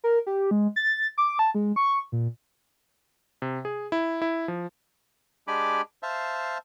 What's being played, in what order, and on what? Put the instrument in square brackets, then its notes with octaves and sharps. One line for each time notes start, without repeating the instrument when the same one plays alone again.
[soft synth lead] A#4
G4
G#3
A6
D6
A5
G#3
C#6
A#2
[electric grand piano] C3
G#4
E4
E4
F3
[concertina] G#3 D4 G4 G#5 B5 D6
C5 E5 F5 A5